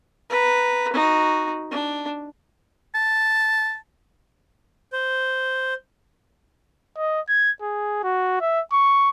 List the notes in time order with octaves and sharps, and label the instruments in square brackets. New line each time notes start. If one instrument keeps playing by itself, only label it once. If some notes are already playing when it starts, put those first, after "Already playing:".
[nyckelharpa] B4 A#5
D#4 F#4
D4
[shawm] A5
[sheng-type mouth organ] C5
[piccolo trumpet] D#5
G#6
G#4
F#4
E5
C#6